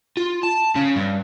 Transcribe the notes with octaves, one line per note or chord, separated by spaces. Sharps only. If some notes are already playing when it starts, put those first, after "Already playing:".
F4
A5
C#3
G2